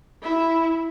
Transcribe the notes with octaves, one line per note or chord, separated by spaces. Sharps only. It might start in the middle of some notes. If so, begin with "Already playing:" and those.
E4